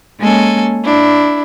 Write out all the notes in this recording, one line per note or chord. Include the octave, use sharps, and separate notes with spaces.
G#3 A#3 C#4 A4 G#5
D4 E4